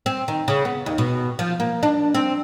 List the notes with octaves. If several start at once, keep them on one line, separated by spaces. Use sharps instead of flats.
C4
D#3
C#3
B3
D#2
B2
F3
A#3
D4
C4